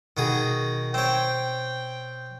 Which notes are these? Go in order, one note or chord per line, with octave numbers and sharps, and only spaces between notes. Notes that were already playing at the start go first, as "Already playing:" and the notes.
B2 D#3 F#4 G#4
C4 C#5 G5 E7